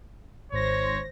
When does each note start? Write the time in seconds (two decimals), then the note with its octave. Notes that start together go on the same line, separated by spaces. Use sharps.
0.52 G#1 C5 C#5 A#6